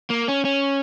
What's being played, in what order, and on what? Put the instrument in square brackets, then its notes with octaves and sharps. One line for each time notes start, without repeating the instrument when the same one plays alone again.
[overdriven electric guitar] A#3
C#4
C#4